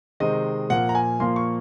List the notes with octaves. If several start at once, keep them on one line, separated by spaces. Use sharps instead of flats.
C3 D#3 G#3 C4 D#5
A#2 F3 A#3 F#5
A#5
G#5
A#2 F3 A#3 C6
C#6